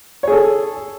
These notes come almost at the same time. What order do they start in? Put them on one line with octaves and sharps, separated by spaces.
C#5 G#4 A4